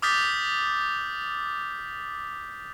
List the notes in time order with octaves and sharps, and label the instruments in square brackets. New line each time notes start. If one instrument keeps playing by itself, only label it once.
[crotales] D6 D#6 F6 G6 A6 B6